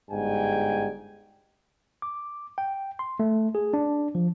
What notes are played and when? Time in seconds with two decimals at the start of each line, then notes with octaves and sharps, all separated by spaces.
0.11 G1 G#2 G3 G5 G#5
2.02 D6
2.58 G5
2.99 C6
3.20 A3
3.55 G#4
3.73 D4
4.15 F3